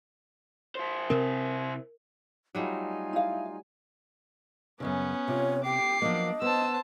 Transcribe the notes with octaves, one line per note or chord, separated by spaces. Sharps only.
E4 C5
C3 C4 A#4
F#3 G3 A3 D#4 F4 G#5
E4 F5
F#2 A#2 C#3 B3 C#4
C3 F4 C#5
G4 G5 D6 C7
F3 F#3 A#3 D4 D#5
B3 C5 A5 E6